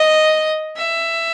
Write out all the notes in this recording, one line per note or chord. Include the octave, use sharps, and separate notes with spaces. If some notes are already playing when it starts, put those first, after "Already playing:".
Already playing: D#5
E5